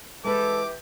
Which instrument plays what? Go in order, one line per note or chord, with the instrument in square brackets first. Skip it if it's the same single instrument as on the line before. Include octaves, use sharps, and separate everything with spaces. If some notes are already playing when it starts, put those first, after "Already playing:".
[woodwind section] E3 G4 [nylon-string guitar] G#3 B4 [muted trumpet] A4 [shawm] D6